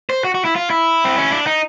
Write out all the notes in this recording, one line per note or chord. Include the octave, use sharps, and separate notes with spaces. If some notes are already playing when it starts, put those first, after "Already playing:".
C5
F#4
F#4
E4
F4
E4
C4
C#4
D4
D#4